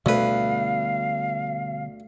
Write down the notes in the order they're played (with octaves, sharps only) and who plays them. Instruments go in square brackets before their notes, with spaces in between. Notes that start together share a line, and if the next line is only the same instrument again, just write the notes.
[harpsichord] D2 B4 [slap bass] B2 D3 G3 [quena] F5